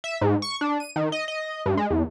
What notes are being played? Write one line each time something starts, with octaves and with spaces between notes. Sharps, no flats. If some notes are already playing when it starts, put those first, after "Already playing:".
E5
G#2
C#6
D4
D#7
D#3
D#5
D#5
G2
G#3
E2